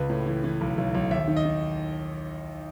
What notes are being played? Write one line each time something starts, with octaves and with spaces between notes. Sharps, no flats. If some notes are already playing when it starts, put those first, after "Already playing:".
Already playing: C#2 B4
A2
E3
E3
B1
B1
B1
D#2 E5
D#3
D#5
D#3